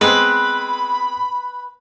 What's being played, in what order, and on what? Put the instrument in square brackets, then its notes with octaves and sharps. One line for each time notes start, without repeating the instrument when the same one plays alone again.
[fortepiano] G#3 B3 C4 [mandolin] B4 [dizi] B5